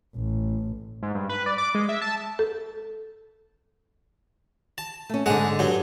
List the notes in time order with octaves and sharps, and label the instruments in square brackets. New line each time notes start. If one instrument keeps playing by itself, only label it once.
[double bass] A1
[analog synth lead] G#2
G2
B4
D5
D6
G#3
E5
A5
[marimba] A4
[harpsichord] A5
[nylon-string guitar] A3 C#4
[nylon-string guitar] G#2 D3 [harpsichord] G#3 F#5
[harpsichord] G2 F#3